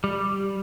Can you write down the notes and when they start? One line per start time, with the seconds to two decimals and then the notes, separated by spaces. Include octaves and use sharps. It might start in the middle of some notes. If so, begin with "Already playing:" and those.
0.04 G3